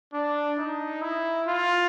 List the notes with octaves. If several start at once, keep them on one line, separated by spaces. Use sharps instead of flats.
D4
D#4
E4
F4